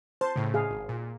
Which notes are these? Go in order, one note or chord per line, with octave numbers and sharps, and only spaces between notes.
C5 A5
A2 C#3
G#4 F5
G#1
A#2